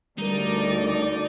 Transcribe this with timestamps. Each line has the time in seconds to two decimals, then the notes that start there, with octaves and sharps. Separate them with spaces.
0.18 D2 G3 D#4 A#4 D5